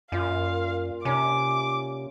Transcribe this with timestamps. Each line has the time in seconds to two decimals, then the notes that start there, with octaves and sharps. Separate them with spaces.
0.12 F#2 A#2 F4 D5 F5
1.05 C3 C#4 D#4 D6